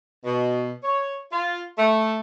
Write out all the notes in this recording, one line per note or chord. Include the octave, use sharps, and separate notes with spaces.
B2
C#5
F4
A3